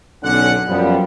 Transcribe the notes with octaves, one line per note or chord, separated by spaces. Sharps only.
B1 D3 C#4 F#5
F#2 F3 G3 B3